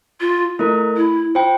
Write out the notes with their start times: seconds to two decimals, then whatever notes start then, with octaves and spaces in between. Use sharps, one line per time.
0.21 F4
0.59 A3 E4 A#4
0.97 E4
1.35 F4 C5 G5